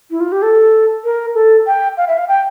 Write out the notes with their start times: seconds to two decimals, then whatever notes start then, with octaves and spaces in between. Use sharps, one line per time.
0.10 E4
0.20 F4
0.32 G4
0.42 A4
1.04 A#4
1.35 A4
1.67 G5
1.97 F5
2.08 E5
2.18 F5
2.28 G5